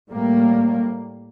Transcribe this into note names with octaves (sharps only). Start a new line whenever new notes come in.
A2 G3 A#3